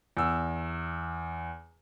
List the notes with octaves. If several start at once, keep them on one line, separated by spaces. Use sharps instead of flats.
E2 E6